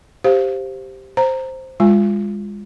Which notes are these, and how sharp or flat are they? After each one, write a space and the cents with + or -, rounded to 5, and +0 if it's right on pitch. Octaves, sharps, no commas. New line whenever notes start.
G4 +0 C5 +0 F5 +0
C5 +0 A#5 -10
G#3 -30 F4 +0 G#5 +0